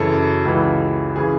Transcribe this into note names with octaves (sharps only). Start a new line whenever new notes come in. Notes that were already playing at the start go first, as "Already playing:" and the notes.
Already playing: F#2 C#3 E3 A4
C#2 C#3 E3
C#3 E3 G#4